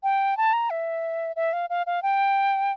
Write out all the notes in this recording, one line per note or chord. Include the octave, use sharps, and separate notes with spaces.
G5
A5
A#5
E5
E5
F5
F5
F5
G5